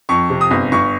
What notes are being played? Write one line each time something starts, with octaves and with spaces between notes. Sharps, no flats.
F2 C#6
C3
D#6
G1
G1 C#6